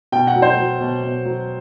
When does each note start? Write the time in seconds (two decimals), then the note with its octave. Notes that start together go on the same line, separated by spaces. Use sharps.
0.12 B2 G5
0.27 F#5
0.36 F#3
0.42 C5
0.57 F#3
0.81 B2
1.03 B2
1.25 F#3